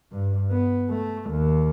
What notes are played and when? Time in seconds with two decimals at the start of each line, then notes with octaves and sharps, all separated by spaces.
0.12 G2
0.51 B3
0.90 A3
1.31 D#2